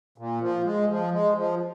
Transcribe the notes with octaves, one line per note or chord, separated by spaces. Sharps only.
A#2
F3
G#3
F3
G#3
F3